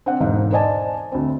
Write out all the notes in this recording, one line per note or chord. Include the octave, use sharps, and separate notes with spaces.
C4 D4 F#5
E1 G#2 D#4 F5
C5 D5 D#5 G#5 A5
D2 C4